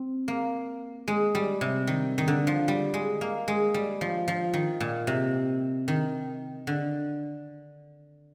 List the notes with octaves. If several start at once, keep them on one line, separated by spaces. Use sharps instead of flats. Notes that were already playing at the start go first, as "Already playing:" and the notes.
Already playing: C4
A#3
G#3
G3
C3
D#3
D#3
D3
F3
G3
G#3
A#3
G#3
G3
F3
F3
D#3
A#2
C3
D#3
D3